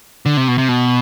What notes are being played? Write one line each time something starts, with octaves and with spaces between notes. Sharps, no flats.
D3
C3
B2
C3
B2